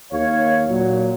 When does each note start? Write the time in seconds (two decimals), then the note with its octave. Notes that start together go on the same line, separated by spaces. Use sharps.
0.12 D#2 C#5 F5
0.70 A#2 F#3